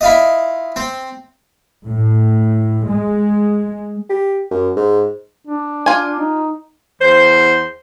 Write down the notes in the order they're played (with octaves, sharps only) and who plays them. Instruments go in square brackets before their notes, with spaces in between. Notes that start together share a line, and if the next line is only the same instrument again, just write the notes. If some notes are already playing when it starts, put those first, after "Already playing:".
[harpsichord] E4 F4 D#5
C4
[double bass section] A2
G#3
[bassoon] G4
F#2
G#2
[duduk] D4
[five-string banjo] F4 G#5
[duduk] D#4
[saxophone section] E2 C5